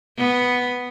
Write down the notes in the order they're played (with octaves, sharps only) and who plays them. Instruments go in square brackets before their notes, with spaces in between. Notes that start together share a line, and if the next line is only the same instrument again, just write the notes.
[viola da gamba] B3